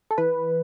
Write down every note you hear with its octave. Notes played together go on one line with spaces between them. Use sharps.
A4
E3 B4